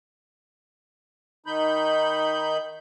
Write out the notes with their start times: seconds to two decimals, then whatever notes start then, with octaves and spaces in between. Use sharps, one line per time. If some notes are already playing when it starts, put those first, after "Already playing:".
1.46 D#3 D#4 B5 G6